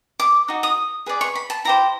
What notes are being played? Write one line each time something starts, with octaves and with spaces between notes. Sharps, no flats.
D6
D#4 F#4
D#6
G#4 B4 D5
C#6
B5
A5
E4 G4 C5 A#5